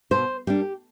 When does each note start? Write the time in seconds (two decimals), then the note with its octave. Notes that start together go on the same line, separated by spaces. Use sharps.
0.11 B2 C5
0.47 G3 A#3 D4 G4